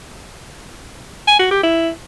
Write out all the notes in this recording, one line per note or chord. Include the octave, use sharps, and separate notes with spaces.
G#5
F#4
G4
E4